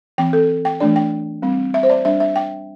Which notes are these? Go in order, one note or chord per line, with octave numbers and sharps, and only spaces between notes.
E3 C4 G5
A4
G5
E3 A3 D4 D5
G5
G3 C4
E5
C5
D5
G3 D4 E5
E5
G5